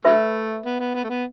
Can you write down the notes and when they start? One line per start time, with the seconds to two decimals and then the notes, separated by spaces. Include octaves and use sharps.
0.05 D3 F#3 A3 B4 E5 B5
0.65 B3
0.80 B3
0.95 B3
1.04 A3
1.10 B3